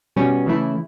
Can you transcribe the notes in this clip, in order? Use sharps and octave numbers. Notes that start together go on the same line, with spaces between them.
B2 G3 C#4
C#3 E3 A3 E4